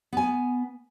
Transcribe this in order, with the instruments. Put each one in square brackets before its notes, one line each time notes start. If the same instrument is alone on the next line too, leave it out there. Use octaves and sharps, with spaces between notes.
[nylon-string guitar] B3 G#5